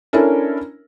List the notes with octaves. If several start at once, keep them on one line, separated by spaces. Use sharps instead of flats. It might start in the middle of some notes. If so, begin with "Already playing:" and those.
C#4 D4 E4 A4 A#4